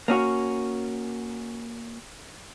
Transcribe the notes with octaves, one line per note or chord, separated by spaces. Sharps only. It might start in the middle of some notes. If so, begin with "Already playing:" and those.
A#3 C#4 F#4